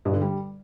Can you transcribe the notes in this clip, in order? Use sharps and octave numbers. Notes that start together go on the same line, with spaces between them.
G2
D3
G3